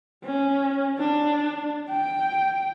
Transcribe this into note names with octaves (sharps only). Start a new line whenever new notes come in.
C#4
D4
G5